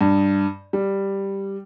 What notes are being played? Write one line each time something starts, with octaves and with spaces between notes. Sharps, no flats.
G2
G3